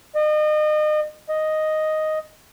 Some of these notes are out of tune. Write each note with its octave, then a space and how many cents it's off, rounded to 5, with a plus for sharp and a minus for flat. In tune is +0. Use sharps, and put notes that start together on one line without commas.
D#5 -35
D#5 +0